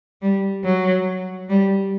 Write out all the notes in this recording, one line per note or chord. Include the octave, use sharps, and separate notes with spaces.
G3
F#3
G3